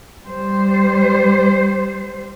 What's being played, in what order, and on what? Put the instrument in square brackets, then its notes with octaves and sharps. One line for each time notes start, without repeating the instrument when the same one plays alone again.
[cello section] G3 C5